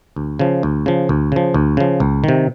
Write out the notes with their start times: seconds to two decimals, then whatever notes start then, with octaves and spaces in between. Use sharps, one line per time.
0.16 D2
0.39 C#3 F3
0.63 D2
0.86 C#3 F3
1.09 D2
1.32 C#3 F3
1.54 D2
1.77 C#3 F3
2.00 C#2
2.24 C3 D#3